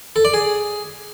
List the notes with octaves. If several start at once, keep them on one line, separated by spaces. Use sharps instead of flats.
A4
D5
G#4